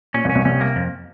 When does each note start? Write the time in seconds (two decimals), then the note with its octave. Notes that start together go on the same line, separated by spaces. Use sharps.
0.14 A#2 C#4
0.25 C2 C3
0.30 C#4
0.35 C2 C3
0.45 C2 C3 C#4
0.61 A#3
0.76 F2